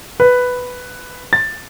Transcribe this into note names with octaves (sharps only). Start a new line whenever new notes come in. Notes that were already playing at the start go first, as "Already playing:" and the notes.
B4
A6